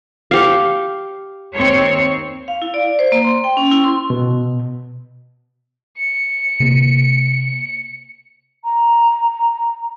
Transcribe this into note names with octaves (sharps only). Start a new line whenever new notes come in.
G4 F5
D#2 C4 C#5
F5
E4
D5
C5
A#3
C6
G5
C#4
E4
C6
B2
C#7
C3 A#3
A#5